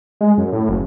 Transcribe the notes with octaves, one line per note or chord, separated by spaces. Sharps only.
G#3
F#2
A2
F#1